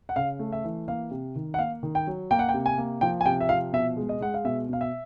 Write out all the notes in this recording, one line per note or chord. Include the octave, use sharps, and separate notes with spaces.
F#5
C#3 F5
A3
E5
E3
A#3 F5
C3
D#3
F#5
A#3 F5
D#3
G5
F#3
A#3 G5
F#5
G5
C3
G#5
A#3
F3 G5
G#5
C3 G5
E5
F3 F5
B2 E5
G#3
D#5
G#3 F#5
F5
B2 E5
B2 F5
E5